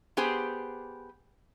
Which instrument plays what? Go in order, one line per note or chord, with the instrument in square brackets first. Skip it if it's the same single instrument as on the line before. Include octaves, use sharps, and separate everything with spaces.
[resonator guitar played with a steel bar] B3 G4 G#4 C5